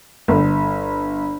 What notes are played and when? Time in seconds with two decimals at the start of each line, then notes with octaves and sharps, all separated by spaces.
0.28 G1